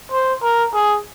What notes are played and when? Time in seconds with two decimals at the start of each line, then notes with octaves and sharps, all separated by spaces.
0.12 C5
0.43 A#4
0.75 G#4